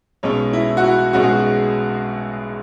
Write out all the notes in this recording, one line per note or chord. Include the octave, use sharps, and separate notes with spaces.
B1 B2 G#3 C#4 C#5
E4
F#4
E4
B1 B2 G#3 C#4 F#4
G#4
F#4